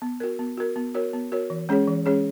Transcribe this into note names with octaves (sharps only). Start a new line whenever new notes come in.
B3
F#4 A#4
B3
F#4 A#4
B3
F#4 A#4 C#5
B3
F#4 A#4 C#5
E3
G#3 C#4 G#4 C#5
E3
G#3 C#4 G#4 C#5